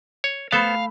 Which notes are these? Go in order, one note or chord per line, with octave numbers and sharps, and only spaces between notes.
C#5
A3 B3 A4 C5 F5 B5